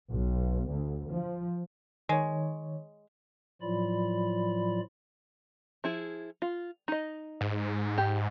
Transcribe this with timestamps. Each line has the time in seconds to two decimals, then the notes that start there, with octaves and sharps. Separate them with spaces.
0.11 B1
0.70 D2
1.12 F3
2.09 D#3 G#3 C#5
3.62 A2 F3 F#3 F4 D5 B5
5.84 F3 E4 G#4
6.42 F4
6.88 D#4 D#5
7.41 G#2
7.98 G4